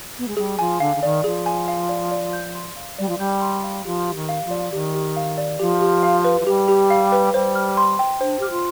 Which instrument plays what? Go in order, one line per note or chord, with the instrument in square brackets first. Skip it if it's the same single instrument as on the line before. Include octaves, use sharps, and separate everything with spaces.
[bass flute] B3
G#3
[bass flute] G3 [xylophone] G#4
[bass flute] F3 [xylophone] G#5
[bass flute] D3 [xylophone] F5
[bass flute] D3
[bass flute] D#3 [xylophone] D5
[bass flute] F3 [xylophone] G#4
[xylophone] G#5
F5
D5
D5
G6
C6
F5
[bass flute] G3 [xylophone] D5
[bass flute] F3
[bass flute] G3 [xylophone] G6
[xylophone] C6
F5
[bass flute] F3 [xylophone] G4
[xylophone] G4
[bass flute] D#3
[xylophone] F5
[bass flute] F3
[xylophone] D5
[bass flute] D#3 [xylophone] G4
[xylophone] G4
F5
D5
[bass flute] F3 [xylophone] G4
[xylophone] G4
F5
B4
[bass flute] F3
[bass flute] G3 [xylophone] G4
[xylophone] G4
F5
B4
[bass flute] G3 [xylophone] C5
[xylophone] F6
C6
G5
[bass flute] D4 [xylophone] C5
[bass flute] G4 [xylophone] F6
[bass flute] F4